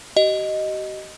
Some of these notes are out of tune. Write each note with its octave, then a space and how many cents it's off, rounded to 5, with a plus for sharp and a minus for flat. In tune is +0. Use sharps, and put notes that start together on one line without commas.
G4 -45 D#5 +0